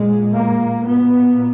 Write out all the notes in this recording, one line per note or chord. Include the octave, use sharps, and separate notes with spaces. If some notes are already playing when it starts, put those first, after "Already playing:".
Already playing: A#2 G#3
A#3
A#2 B3